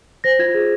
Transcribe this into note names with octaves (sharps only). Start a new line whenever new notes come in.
C5 A#6
F4 G#6
G#4